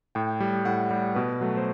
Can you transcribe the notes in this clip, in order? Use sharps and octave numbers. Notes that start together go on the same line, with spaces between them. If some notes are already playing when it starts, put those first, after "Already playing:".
A2 G5
G3
A2 F#5
G3
B2 B4
F#3 A3
C5